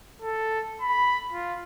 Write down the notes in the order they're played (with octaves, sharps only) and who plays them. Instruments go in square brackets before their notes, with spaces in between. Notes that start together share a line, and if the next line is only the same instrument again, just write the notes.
[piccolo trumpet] A4
B5
F4